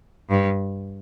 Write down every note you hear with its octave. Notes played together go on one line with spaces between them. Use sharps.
G2